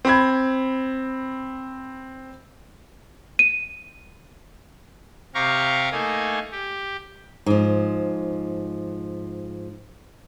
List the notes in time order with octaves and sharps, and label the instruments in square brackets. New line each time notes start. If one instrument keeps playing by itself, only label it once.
[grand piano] C4 B5 G#6
[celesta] D#7
[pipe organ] C3 G4 F5 A#5 C#6
A3 A#3 D#4 G#5
G4
[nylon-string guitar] G#2 F3